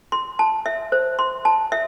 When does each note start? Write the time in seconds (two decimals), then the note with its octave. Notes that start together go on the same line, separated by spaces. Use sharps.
0.12 C6
0.39 A5
0.66 E5
0.92 C5
1.19 C6
1.45 A5
1.72 E5